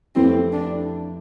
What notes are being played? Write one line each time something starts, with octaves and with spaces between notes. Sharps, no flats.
F2 E3 A3 C4 E4 G4
D4